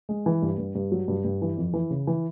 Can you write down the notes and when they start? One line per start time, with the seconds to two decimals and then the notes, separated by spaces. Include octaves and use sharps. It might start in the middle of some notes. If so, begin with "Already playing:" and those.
0.09 G#3
0.26 E3
0.42 G2
0.58 G2
0.75 G2
0.92 F#3
1.08 G2
1.25 G2
1.42 E3
1.57 F2
1.74 E3
1.90 C#3
2.07 E3